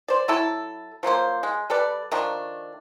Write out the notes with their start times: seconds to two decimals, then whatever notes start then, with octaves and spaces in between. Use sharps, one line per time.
0.08 C5 D5
0.28 F#3 E4 A4
1.03 F3 F#3 A#3 C5
1.43 G#3
1.70 G3 A4 B4 D5
2.12 D#3 F3 A3 D4